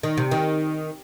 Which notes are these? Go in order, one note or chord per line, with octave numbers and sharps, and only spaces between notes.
D#3
C3
D#3